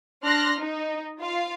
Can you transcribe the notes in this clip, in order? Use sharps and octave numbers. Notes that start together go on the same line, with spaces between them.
D4 C6 F6 F#6 A#6
D#4
F4 F5